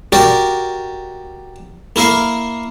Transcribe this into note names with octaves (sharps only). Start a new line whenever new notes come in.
F#4 G4 A#4 D5
A#3 E4 A#4 F5